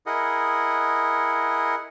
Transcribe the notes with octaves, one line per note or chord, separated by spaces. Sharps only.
E4 G#4 A#4 D#5 F#5